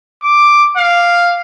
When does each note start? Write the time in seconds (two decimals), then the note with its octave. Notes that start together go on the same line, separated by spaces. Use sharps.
0.22 D6
0.77 F5